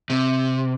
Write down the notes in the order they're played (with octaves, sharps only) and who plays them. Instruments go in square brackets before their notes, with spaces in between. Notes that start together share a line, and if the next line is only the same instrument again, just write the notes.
[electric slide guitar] C3